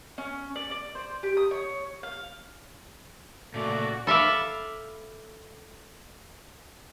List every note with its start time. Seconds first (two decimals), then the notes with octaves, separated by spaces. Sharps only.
0.18 C#4
0.56 D5
0.71 D5
0.95 C5
1.23 G4
1.37 D#6
1.51 C#5
2.03 F5
3.54 A#2 C#3 A3 F#4 D5
4.07 A4 E5 F5 B5 D6